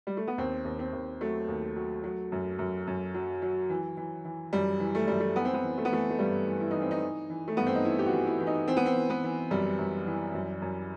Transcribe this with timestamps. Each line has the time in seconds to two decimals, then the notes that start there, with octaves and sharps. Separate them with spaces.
0.07 G3
0.17 A3
0.27 B3
0.38 D#2 C4
0.65 D#2
0.79 C4
0.93 D#2
1.21 F#3 A3
1.48 D#2
1.76 F#3
2.04 F#3
2.32 F#2
2.59 F#2
2.87 F#2
3.14 F#3
3.42 F#3
3.70 E3
3.97 E3
4.25 E3
4.53 F#2 G3
4.80 E3
4.95 A3
5.08 F#2 G3
5.20 A3
5.36 E3 B3
5.45 C4
5.54 B3
5.64 E3
5.78 A3
5.85 B3
5.92 E3 A3
6.10 A3
6.19 G2 G3
6.46 E3
6.61 E4
6.71 E3 D#4
6.81 C4
6.91 D#4
7.01 E3
7.30 E3
7.48 A3
7.57 G2 B3
7.67 C4
7.75 D#4
7.85 E3 E4
7.99 G4
8.06 F#4
8.12 E3
8.27 E4
8.40 E3
8.47 D#4
8.68 E3 C4
8.77 B3
8.86 C4
8.96 E3
9.10 B3
9.24 E3
9.51 F#2 G3
9.78 F#2
10.07 E3
10.34 F#2
10.62 F#2